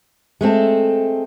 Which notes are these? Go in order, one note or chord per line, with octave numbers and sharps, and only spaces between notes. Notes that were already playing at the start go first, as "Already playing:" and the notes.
G#3 A3 C4 A4